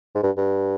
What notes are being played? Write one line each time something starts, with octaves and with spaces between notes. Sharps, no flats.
G#2
G2
G2